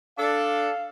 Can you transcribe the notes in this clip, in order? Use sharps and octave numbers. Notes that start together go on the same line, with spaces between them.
D4 A4 F5